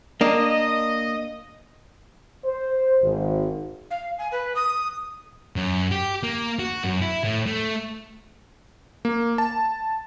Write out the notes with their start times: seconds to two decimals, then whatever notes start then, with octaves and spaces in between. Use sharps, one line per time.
0.21 A#3 D4 D#5
2.45 C5
3.02 G#1
3.90 F5
4.18 G#5
4.31 B4
4.55 D#6
5.56 F#2
5.91 G4
6.23 A#3
6.59 F#4
6.84 F#2
7.02 E4
7.24 A2
7.47 A3
9.05 A#3
9.38 A5